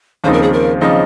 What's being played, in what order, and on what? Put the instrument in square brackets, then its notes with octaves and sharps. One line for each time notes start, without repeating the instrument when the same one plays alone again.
[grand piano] D#2 C#3 F3 C4 D#4 [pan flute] C5
[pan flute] A#4
G#4
A#4
[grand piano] C#3 F3 C4 D#4 [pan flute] D#5